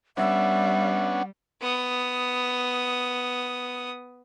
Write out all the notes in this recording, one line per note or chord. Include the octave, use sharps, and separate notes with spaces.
G3 B3 C#4 D4 E5 F#5
B3 D#6